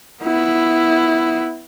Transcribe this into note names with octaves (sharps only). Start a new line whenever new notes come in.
B3 E4